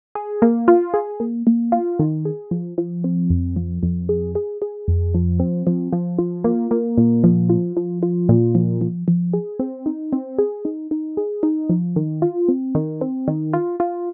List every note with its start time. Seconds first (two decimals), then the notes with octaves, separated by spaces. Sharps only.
0.15 G#4
0.42 A#3
0.68 F4
0.94 G#4
1.20 A#3
1.47 A#3
1.72 F4
1.99 D#3
2.25 G#4
2.51 F3
2.78 F3
3.04 C4
3.30 F2
3.56 F3
3.83 F2
4.09 G#4
4.35 G#4
4.62 G#4
4.88 F2
5.14 F3
5.40 C4
5.67 F3
5.93 F3
6.19 F4
6.44 A#3
6.71 A#3
6.98 A#2
7.24 F3
7.49 F4
7.77 F3
8.03 F4
8.29 A#2
8.55 F3
8.81 F3
9.08 F3
9.33 G#4
9.59 C4
9.86 D#4
10.13 C4
10.38 G#4
10.65 D#4
10.91 D#4
11.17 G#4
11.43 D#4
11.69 F3
11.96 D#3
12.22 F4
12.49 C4
12.75 D#3
13.01 C4
13.28 D#3
13.53 F4
13.80 F4